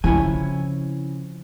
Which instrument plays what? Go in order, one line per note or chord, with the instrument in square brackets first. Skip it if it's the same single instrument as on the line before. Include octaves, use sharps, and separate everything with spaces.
[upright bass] C#3 [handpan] F3 [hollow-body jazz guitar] C#4 E4 G#5